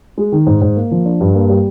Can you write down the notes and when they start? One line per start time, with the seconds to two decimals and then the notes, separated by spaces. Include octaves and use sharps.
0.18 G#3
0.32 D#3
0.47 G#2
0.62 G#2
0.76 A#3
0.91 F3
1.05 D4
1.21 G2
1.35 A#3
1.50 G3